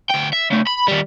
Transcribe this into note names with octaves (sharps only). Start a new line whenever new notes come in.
D2 G5
E5
C#3 A3
B5
D#3 G3